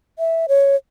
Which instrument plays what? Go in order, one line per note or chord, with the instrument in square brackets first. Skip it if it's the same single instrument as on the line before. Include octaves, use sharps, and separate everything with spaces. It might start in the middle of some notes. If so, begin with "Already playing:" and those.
[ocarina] E5
C#5